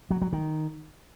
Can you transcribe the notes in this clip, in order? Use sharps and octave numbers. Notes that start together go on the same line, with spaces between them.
F#3
F#3
D#3